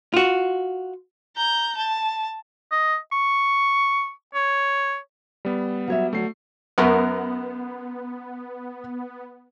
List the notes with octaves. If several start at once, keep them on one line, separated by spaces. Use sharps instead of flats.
F4 F#4
A#5 G6
A5
D#5
C#6
C#5
G3 B3
F#3 C#5 E5
D2 F#3 A3 F#4 C7
F#2 B3 A#4 C#6